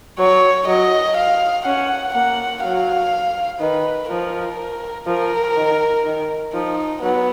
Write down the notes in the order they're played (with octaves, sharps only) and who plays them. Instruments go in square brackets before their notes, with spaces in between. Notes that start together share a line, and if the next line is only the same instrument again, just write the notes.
[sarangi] F#3 [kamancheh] C#5
[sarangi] F#3 [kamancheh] D#5
[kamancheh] F5
[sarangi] C#4 [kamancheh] F#5
[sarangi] A#3 [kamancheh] F#5
[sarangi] F#3 [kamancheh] F5
[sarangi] D#3 [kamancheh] B4
[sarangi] F3 [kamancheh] A#4
[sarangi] F3 [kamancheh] A#4
[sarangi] D#3
D#3
[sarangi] F3 [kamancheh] D#4
[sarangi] F#3 [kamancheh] B3